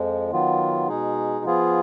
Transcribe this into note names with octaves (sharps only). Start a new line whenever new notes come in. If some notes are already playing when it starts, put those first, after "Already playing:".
Already playing: F2 F3 G#3
D#3 F#3 B3 F4
B2 G#3 D#4 G#4
F3 B3 F4 G#4